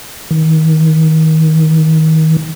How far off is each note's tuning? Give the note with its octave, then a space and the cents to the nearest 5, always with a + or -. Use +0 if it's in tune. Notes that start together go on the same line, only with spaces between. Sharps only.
D#3 +30